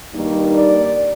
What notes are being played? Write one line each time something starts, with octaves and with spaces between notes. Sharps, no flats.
G2 D#3 G3 A#3 D#4
D5